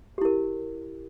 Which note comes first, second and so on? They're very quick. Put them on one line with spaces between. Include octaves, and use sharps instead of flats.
G4 E4 A#4